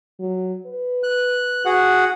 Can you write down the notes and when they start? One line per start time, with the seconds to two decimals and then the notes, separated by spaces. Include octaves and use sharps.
0.20 F#3
0.66 B4
1.03 F#6
1.65 F#4 G#4 F#5